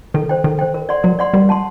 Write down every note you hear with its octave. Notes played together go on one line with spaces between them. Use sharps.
D#3 A4
C5 G5
D#3 A4
C5 G5
A#4
D5 F#5 C6
F#3 A#4
D5 F#5 C6
G3 A#4
F#5 A5 C6